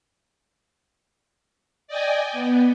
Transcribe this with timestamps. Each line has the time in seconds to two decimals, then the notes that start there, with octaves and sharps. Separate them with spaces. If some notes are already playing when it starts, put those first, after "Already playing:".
1.88 D5 D#5 G5 G#5
2.33 B3